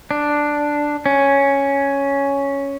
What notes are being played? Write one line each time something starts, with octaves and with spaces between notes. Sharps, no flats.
D4
C#4